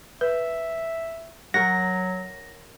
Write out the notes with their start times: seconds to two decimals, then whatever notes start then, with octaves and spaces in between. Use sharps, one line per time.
0.21 B4 E5
1.54 F#3 A#4 C#5 F#5 A#6